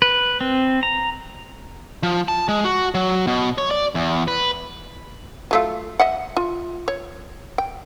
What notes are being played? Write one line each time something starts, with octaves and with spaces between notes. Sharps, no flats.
B4
C4
A#5
F3
A5
G#3
F#4
F#3
B2
C#5
D5
E2
B4
F#3 A3 F4
D#5 E5 F#5
F4
C#5
G5